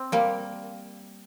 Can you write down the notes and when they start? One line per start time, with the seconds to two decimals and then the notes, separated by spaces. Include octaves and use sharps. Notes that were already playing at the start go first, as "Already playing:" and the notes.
Already playing: C4
0.12 G3 A#3